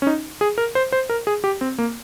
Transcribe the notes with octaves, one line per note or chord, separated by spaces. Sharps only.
C#4
D#4
G#4
A#4
C5
C5
A#4
G#4
G4
C4
A#3